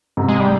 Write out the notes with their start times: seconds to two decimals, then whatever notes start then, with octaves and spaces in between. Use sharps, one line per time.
0.17 G#2 C3
0.29 G#3
0.40 G3